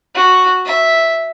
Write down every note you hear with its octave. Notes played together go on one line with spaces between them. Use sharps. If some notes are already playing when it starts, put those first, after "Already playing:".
F#4
E5